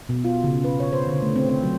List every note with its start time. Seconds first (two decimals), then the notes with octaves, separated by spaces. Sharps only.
0.09 B2
0.24 F4
0.44 C#3
0.64 B4
0.80 C#5
0.93 C5
1.07 D3
1.22 A3
1.36 C4
1.49 C4
1.63 F#3